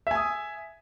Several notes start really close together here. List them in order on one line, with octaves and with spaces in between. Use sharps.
E5 G#5 D#6